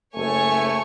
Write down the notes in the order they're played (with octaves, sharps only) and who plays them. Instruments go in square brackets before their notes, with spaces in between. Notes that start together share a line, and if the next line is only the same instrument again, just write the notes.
[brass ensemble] F#1 A3 [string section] C#5 G#5 C#6